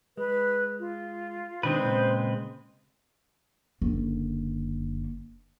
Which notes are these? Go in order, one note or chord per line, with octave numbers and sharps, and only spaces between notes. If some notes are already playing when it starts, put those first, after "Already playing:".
G#3 B4
F4
B2 D#3 G#3 C4 D4 B4 C5
A#2 C#3
F#1 D3